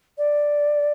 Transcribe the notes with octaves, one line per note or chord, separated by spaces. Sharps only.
D5